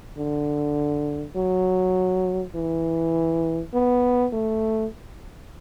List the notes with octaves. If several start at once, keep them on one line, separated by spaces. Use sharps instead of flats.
D3
F#3
E3
B3
A3